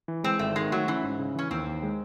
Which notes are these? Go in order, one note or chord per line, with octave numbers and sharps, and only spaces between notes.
E3
G#3 C4
G#1 A3
D#3 G#3
F#3 A3
E3 C#4
G#2
C#3
E3 C#4
D#2 C4
D#2
G#3